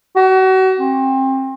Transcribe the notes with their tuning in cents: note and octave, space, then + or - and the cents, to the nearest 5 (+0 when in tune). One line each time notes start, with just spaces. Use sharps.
F#4 +35
C4 +30